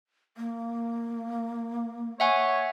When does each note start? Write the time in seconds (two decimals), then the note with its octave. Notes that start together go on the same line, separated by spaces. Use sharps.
0.37 A#3
2.20 C#5 E5 F#5 G#5